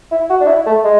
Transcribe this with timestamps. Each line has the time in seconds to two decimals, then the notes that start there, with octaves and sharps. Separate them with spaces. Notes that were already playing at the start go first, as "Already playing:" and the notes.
0.11 E4
0.30 F#4
0.40 D4
0.47 E4
0.66 A3
0.84 G#3